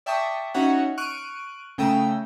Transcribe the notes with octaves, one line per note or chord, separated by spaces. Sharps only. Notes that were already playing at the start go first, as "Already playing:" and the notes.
D5 E5 G5 A5 C#6 D#6
C#4 D#4 F#4 C#5 E5 F#5
C#6 F6 F#6 D7 D#7
C#3 A3 G5 A#5 D#6 E6